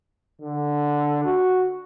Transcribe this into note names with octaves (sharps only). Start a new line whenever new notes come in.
D3
F#4